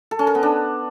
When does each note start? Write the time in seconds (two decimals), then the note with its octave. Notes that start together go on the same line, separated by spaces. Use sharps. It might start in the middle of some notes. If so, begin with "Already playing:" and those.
0.11 A4
0.19 C#4
0.27 A#4
0.35 B3
0.43 D4